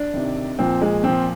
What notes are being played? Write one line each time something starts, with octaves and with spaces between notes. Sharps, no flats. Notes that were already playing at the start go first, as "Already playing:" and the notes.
Already playing: D4
C3 D#3
A#2 F3 C4
G#3
A#2 F3 C4